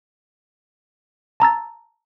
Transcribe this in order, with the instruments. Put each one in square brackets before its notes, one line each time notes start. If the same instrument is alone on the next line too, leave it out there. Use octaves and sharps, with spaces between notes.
[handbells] A5 A#5 E6 A6